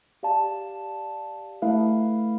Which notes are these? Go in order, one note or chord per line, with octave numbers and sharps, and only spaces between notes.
G4 D5 F5 A5
A3 E4 B4 F5